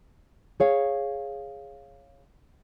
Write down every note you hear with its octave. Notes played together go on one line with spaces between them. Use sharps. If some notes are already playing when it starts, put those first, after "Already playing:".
G#4 C#5 F5